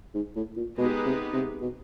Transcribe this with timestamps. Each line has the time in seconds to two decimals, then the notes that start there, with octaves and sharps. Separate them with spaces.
0.14 G#2
0.35 A2
0.56 A#2
0.77 B2 G#3 B3 D#4 G4 B4
1.05 C3
1.33 C3
1.61 B2